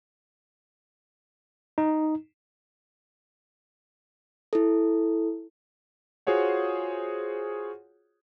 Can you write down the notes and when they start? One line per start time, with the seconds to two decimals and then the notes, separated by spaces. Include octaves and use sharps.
1.78 D#4
4.53 E4 A4
6.27 F4 F#4 G#4 C5 C#5 F#5